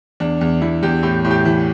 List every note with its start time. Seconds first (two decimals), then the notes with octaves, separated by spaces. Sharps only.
0.20 E2 D4
0.41 E2
0.61 E2 E4
0.83 E2 G4
1.03 A2 G4
1.24 A2
1.31 G4
1.45 E3